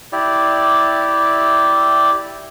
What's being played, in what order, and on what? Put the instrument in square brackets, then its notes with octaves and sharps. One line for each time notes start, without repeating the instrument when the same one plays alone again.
[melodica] E4 G4 D5